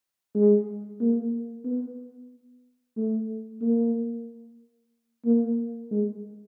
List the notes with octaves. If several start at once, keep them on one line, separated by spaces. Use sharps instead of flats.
G#3
A#3
B3
A3
A#3
A#3
G#3